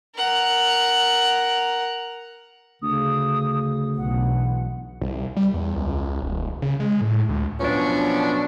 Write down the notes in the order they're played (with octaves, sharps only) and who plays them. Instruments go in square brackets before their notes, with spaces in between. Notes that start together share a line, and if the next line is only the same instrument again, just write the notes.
[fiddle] A#4 F#5
[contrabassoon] D2 [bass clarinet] C#3 [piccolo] D#6
[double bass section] B1 B2 E3 [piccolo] F#5
[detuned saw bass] C2
G3
E2
C#2
D#1
C#3
G#3
A2
D2
[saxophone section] B2 F3 F#3 C#4 D4 B4